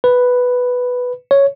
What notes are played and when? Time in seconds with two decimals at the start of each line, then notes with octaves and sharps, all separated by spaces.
0.04 B4
1.31 C#5